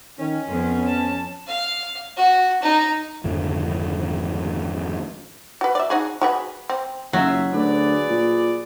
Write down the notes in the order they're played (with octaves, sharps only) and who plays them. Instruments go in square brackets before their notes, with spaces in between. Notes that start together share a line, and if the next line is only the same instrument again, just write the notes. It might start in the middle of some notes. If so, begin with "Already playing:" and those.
[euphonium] D#3 [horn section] C#4
[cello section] F2 [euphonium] B3
[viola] A5
[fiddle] F5
F#4
D#4
[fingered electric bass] G#1 F2 D3 F3
[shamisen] F#4 B4
D5 E5
D#4 F#4 G#4
F#4 G#4 B4
C4
[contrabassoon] F#1 [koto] F#3 [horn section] D#4 F4 E5
[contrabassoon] D2 [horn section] G#4 B4 D5
[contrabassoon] A#2